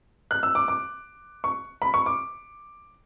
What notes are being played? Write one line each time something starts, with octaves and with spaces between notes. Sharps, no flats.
F#6
E6
D6
D6
C#6
B5
C#6
D6